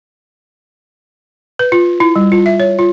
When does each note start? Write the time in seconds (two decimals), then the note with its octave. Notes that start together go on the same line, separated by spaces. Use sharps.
1.59 B4
1.72 F4
2.00 E4
2.16 G3
2.32 F4
2.46 E5
2.60 C#5
2.79 F4